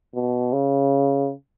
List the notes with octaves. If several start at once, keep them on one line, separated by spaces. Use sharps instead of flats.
B2
C#3